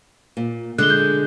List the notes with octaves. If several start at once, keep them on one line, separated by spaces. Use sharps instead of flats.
A#2
D3 G#3 F#6 G7
G6